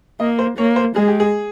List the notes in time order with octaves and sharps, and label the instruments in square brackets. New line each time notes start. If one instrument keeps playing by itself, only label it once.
[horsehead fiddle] A#3 [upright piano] D#5
[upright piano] C5
[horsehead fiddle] A#3 [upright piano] C#5
[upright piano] C5
[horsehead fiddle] G#3 [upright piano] G#4
[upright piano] G4
G#4